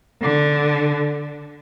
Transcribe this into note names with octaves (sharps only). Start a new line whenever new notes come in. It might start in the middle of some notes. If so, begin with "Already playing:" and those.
D3